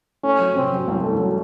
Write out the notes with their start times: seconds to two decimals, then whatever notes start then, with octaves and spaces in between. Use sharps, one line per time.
0.23 A3 C#4
0.39 F#3
0.55 C3 C4
0.72 F#3
0.88 C2
1.04 A3
1.19 F#3